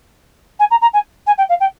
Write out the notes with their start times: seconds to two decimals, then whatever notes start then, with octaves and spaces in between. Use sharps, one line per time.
0.60 G#5
0.71 A#5
0.82 A#5
0.94 G#5
1.27 G#5
1.38 G5
1.49 F5
1.60 G5